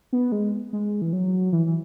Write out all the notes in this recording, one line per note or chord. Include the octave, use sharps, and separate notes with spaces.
B3
G#3
G#3
E3
F#3
E3
E3